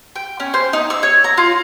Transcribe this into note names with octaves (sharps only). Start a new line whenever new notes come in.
G5
C#4
C5
D#4
E6
C#5
A#5
F4